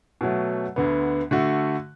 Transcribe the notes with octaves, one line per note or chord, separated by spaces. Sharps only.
B2 F#3 A3
D2 D3 B3
D3 A3 F#4